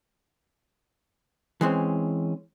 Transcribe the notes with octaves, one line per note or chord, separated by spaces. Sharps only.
E3 G#3 C4 C#4